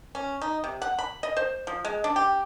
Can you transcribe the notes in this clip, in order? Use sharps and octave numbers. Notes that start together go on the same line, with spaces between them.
C#4
D#4
C3
F#5
B5
D#5
C5
F3
G#3
D4
G4